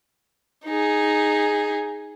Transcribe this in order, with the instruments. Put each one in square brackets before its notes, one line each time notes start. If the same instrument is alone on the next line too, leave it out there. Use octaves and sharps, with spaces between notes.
[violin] D#4 G#4